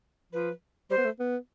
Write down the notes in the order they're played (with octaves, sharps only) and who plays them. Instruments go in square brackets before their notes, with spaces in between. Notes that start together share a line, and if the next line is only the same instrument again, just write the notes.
[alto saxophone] F3 [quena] B4
[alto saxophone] G3 [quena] C5
[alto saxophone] B3
A3
B3